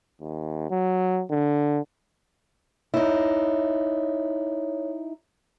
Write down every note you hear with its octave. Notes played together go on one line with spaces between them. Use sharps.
D#2
F#3
D3
D#4 E4 C#5